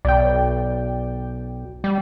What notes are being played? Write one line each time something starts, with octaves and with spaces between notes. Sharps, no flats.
B1 D5 G5
G3